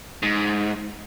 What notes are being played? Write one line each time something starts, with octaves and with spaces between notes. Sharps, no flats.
G#2